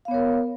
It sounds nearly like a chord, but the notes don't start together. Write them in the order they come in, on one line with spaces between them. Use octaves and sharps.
F5 B3 C#5 A#4